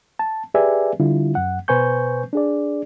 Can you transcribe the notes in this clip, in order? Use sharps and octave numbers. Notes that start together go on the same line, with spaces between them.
A5
G4 G#4 B4 D5 E5 G#5
D3 G3 E4 F4
F#2 F#5
B2 B4 C5 G#5 C#6 G6
D4 G#4 D5